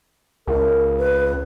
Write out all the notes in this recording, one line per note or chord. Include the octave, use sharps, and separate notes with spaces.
C#2 A#4
B4